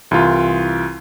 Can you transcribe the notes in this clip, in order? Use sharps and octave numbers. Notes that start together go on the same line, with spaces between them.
C2 E3 E4 F4